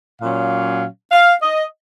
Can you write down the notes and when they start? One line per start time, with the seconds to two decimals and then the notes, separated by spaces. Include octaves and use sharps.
0.20 A#2 F#3 C#4 F5
1.11 F5
1.42 D#5